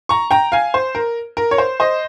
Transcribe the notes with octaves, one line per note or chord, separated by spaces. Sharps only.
A#5 C#6
G5 A#5
F5 G#5
C5
A#4
A#4
C#5
C5
C5 D#5